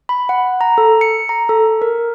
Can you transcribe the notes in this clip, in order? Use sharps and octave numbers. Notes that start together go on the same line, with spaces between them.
B5
F#5
A#5
A4
C#7
A#5
A4
A#4